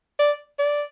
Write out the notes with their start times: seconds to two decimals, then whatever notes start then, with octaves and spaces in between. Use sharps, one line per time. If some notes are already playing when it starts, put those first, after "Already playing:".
0.19 D5
0.59 D5